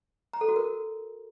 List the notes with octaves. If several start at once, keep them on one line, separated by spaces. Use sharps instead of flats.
A#5
A4
F#4
A#4